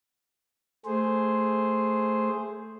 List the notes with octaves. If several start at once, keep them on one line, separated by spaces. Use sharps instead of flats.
A3 G#4 C5